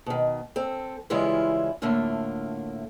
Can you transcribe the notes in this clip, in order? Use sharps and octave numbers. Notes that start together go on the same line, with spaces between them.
B2 D#3
C4 A4
C#3 E3 G3 G#3 E4 F4
A2 D3 A3 A#3 F4